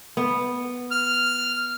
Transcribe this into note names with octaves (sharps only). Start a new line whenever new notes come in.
B3
F6